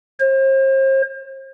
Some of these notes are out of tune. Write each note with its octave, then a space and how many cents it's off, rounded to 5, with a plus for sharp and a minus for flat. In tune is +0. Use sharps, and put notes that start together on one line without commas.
C5 +40